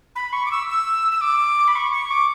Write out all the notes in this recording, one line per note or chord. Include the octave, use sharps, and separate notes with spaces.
B5
C#6
D6
E6
E6
E6
D6
B5
C#6
C#6
D6